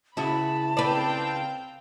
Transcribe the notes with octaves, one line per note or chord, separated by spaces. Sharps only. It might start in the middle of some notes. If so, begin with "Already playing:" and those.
C#2 C#3 E4 F#4 A5 B5
C4 B4 D5 F5 G5